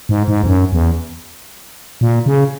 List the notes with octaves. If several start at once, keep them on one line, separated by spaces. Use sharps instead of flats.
G#2
G#2
E2
F#2
E2
A#2
C#3